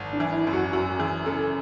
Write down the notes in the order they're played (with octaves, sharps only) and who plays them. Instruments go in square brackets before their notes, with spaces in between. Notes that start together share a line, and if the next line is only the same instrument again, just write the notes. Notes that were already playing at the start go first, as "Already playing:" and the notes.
Already playing: [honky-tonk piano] G#1
[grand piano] D4
[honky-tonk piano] E3
[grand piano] E4
[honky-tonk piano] F#2
[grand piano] F#4
[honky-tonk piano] F#2 [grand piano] F#4
[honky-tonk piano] E3 [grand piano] G#4
[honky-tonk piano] C#3 [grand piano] A4